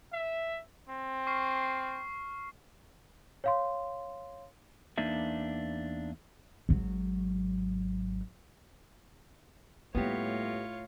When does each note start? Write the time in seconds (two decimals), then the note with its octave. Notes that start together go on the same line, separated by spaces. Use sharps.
0.13 E5
0.89 C4
1.27 C#6 F6 C7
3.44 C#5 F5 C6
4.98 E2 A#3 D4 D#4 E5
6.69 G#1 F#3
9.95 A2 G3 A#3 B3 F4 G4 C#5